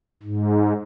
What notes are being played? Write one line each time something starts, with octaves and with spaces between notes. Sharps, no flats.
G#2